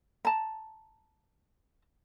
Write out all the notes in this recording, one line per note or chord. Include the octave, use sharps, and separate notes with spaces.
A5 A#5